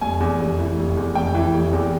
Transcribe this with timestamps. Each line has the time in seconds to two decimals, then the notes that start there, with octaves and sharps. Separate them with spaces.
0.01 F1 G#5
0.20 E2
0.40 F1
0.59 E3
0.77 F1
0.97 E2
1.15 F1 G5
1.34 E3
1.53 F1
1.73 E2